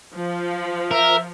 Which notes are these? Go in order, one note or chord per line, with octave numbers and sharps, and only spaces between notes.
F3
A#4 E5